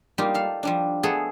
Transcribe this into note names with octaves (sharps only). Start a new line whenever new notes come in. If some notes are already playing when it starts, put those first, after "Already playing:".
G3 A#3 D#4 F4 G4
A4 F5
F3 G3 D4
A3 B3 G#4 A4